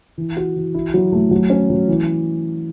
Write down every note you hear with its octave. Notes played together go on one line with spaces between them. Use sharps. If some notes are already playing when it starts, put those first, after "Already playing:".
E3
F#4
E3
E4
F#3
A3
F#3
C#4
F#3
E3